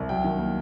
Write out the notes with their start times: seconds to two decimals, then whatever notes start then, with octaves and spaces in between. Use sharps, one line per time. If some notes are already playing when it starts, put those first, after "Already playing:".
Already playing: C2
0.09 F#3 G5
0.24 D#3
0.38 A#3